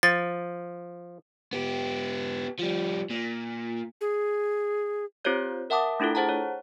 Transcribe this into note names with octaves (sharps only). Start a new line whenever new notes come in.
F3 A6
B3 G4
F3 G3
A#2
G#4
C4 F4 G4 C5 C#5 G6
A#4 E5 F#5 A5 D6 D#6
A3 D4 E4 F4 A4
G#4 C5 F#5 A5 A#5
C#5